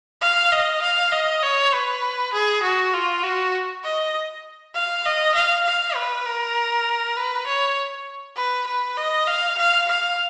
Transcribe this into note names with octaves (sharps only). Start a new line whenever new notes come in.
F5
D#5
F5
D#5
C#5
B4
G#4
F#4
F4
F#4
D#5
F5
D#5
F5
F5
B4
A#4
B4
C#5
B4
B4
D#5
F5
F5
F5